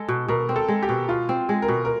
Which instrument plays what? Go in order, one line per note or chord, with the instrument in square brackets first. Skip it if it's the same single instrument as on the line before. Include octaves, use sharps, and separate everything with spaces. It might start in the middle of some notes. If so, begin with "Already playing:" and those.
Already playing: [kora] G#3 [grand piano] A4
[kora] B2
[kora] B2 [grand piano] A#4
[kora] C4
[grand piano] A4
[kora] G#3
[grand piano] G4
[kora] B2
[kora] B2 [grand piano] F4
[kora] C4
G#3
[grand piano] A#4
[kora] B2
[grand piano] A#4